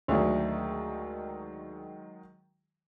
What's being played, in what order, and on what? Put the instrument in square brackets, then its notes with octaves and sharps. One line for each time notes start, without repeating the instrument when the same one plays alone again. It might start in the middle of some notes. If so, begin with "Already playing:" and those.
[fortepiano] D2 [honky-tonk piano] D#3 F#3 G#3